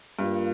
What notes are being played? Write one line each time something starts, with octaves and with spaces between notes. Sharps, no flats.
G2 G3 A#3 F4